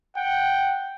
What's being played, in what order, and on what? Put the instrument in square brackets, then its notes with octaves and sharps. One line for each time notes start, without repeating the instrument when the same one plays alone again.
[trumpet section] F#5 G5